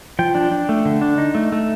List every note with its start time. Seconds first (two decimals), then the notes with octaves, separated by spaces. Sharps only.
0.19 F3 G5
0.35 D4
0.51 D4
0.69 A3
0.85 D3
1.01 D4
1.18 D#4
1.35 A3
1.52 A3